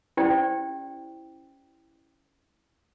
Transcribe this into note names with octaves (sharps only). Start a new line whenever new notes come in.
C#4 E4 G4 C5 D5 G5